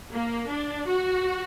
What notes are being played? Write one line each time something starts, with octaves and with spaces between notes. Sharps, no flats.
A#3
D4
F#4